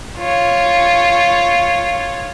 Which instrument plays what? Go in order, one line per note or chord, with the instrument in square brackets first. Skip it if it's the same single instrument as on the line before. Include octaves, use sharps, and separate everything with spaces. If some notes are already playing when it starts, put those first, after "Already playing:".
[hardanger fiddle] F4 C#5